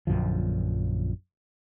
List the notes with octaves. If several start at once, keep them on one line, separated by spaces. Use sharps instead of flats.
A#1 F#2 D3 F3